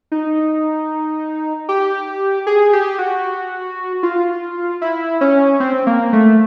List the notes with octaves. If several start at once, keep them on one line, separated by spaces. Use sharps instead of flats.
D#4
G4
G#4
G4
F#4
F4
E4
C#4
C4
A#3
A3